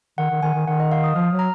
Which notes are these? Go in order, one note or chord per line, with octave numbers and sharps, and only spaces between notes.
D#3 F#5
D#3
D#3 G#5
D#3
D#3 F#5
D#5
F5
D#6
F3 F6
F#3
A#5